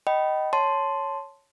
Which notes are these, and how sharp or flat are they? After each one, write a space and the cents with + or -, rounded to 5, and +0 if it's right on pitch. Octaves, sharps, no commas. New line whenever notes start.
D#5 +0 G5 -30 B5 +0
C#5 +0 A5 +0 C6 -5